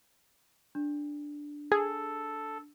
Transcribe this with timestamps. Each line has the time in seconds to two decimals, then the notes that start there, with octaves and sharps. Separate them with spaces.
0.75 D4
1.72 G#4 A4